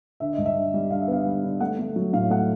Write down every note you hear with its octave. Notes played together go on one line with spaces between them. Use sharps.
D3 E5
D#5
G2
E5
D3
G3
D3 F5
E5
B3 F5
G3
D3
A3 F#5
A3
F#3
A2 F5
A3 F#5